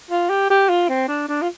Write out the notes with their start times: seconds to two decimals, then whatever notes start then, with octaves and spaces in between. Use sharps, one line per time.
0.11 F4
0.30 G4
0.50 G4
0.69 F4
0.89 C4
1.08 D4
1.28 D4
1.42 F4